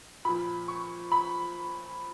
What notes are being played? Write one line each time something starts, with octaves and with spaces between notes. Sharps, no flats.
A#2 F3 B5
C#6
B5